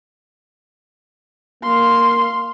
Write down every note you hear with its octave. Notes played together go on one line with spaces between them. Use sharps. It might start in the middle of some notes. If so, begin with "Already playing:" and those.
A#3 F5 C6